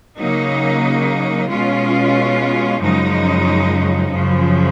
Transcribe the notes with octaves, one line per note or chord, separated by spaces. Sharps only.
C#3 F#3 A#3 D#4
B2 G#3 C#4 F4
F#2 C#3 F3 G#3 D#4
F#2 C#3 F3